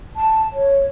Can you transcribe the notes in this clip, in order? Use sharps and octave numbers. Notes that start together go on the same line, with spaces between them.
A5
C#5